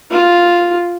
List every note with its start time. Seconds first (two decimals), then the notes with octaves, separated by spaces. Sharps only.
0.11 F4